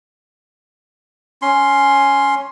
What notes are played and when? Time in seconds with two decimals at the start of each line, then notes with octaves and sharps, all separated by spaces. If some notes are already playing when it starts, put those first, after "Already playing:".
1.42 C#4 C6